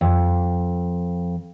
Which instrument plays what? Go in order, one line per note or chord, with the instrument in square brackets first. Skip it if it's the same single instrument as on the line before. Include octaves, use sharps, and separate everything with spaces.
[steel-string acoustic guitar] F2